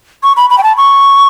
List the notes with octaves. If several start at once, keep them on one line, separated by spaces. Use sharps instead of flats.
C#6
B5
B5
G5
A5
C#6